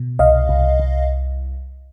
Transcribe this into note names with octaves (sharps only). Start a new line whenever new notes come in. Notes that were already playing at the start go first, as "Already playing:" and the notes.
Already playing: B2
C2 D#5 F5
C2
C2